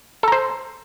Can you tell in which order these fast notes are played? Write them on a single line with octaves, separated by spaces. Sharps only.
A4 A#5 C5